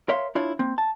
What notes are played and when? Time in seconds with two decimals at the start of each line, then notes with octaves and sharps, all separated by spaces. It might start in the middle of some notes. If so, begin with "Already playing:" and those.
0.09 A#4 C#5 E5 F5 C6
0.35 D4 E4 F4 C#5
0.59 A#3 C4
0.78 A5